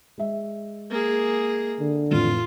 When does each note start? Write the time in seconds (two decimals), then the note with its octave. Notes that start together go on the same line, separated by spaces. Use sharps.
0.18 G#3 E5
0.90 A#3 G#4
1.79 D3
2.11 F2 A2 E3 F4